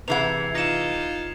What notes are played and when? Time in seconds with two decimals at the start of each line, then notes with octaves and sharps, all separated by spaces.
0.08 C3 E3 G#4 B4 F#5 G#6 C7 F7
0.55 D#4 F4 A#6 C#7 E7